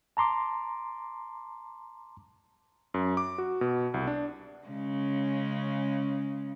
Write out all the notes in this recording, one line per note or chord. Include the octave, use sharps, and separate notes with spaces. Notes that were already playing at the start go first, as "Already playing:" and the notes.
A5 A#5 C6 D6
F#2
D6
F#4
B2
C2
D4
C#3 G#3 C#4